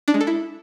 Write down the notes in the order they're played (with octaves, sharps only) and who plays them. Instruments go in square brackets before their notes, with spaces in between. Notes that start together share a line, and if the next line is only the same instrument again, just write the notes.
[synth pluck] D4
G#3
A4
E4